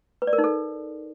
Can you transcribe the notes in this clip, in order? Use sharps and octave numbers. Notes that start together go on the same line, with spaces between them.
B4
D5
A#4
D#4
A4